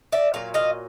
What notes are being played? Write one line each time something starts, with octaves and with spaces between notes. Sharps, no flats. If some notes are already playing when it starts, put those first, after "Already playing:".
D5 E5
A#2 F#3 F5
D#5 F5